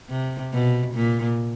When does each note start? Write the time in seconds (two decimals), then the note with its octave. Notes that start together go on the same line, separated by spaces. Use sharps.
0.10 C3
0.53 B2
0.95 A#2